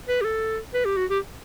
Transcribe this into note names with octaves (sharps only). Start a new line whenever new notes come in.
B4
G4
A4
B4
G4
F#4
G4